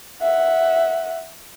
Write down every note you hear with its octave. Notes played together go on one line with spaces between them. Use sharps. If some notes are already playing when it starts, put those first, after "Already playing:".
E5 F#5